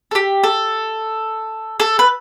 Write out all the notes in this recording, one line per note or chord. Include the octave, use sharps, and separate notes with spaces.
A4
G4
A4
A4
B4